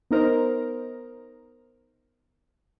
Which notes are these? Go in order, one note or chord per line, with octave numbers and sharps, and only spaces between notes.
B3 D#4 A#4 C5 D#5